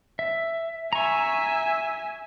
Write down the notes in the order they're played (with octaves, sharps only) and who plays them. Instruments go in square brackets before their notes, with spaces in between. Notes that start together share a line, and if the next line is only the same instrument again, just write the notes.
[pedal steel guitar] E5
[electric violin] E5 G#5 [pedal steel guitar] A#5 C#6